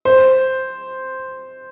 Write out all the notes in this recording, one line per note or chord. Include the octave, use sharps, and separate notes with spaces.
C5